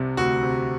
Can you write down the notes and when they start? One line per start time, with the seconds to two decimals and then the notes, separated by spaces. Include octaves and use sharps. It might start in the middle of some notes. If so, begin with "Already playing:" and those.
Already playing: C2 C3
0.17 D2 F#4
0.43 C3